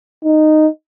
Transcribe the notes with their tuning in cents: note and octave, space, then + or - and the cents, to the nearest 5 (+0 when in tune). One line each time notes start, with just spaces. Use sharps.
D#4 -10